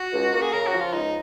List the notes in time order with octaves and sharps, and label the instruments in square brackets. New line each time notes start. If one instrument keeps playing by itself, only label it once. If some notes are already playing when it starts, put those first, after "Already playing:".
Already playing: [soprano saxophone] F#4
[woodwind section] C#2
A#3
[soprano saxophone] G#4
[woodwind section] C#3 [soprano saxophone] A#4
[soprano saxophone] F#4
[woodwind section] F3
[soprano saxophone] F4
[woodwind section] C#2 [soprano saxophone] D#4